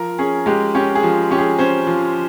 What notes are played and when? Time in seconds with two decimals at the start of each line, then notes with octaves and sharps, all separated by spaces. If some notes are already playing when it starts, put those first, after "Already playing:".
Already playing: F3 A#4
0.19 C#4 G#4
0.46 G#3 G4
0.75 C#4 G4
0.95 G#4
1.03 F3
1.31 C#4 G4
1.38 G#4
1.59 C#4 C5
1.87 F3